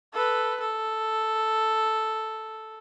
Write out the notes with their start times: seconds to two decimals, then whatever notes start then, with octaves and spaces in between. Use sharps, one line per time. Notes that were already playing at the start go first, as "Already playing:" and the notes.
0.13 A4 B4
0.60 A4